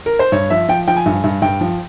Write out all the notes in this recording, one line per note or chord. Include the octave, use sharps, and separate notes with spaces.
A#4
C5
G2 C#5
F3 E5
F3 G5
F3 G5
G#5
G2
G2
G2 G5
F3